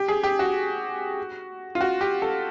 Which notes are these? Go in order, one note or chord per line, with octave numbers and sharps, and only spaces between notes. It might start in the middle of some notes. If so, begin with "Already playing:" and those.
Already playing: G4
G#4
G4
F#4
F4
F#4
G4
A4